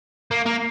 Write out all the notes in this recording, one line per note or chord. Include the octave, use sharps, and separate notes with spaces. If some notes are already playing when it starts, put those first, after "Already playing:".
A#3
A#3